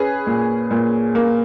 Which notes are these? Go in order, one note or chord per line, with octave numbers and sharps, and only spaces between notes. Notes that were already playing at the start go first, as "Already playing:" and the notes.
Already playing: C#4 G#4 B4
A#2
A#2
A#3